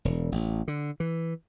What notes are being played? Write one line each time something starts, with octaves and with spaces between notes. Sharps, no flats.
E1
A1
D3
E3